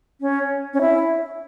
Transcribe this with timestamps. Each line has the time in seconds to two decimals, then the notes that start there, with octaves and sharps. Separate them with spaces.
0.21 C#4
0.74 C#4
0.81 E4